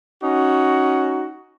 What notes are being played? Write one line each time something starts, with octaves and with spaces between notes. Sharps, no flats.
C#4 D#4 F#4